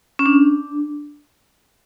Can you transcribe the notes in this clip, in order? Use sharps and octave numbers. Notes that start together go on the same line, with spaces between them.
C#4
D4